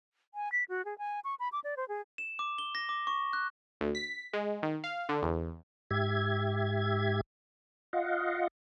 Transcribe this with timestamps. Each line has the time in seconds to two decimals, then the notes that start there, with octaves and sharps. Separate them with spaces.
0.34 G#5
0.52 B6
0.69 F#4
0.85 G#4
0.98 G#5
1.24 C#6
1.39 B5
1.52 D6
1.64 D5
1.77 C5
1.88 G#4
2.18 E7
2.39 D6
2.58 G7
2.75 A#6
2.89 D6
3.07 C#6
3.33 F#6
3.81 D2
3.95 B6
4.33 G#3
4.63 D#3
4.84 F5
5.09 D3
5.23 E2
5.91 G#2 G4 E5 G#6
7.93 F4 D#5 F5 F#5